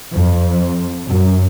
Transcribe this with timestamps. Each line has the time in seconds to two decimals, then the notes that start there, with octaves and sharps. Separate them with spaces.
0.13 F2
1.07 F#2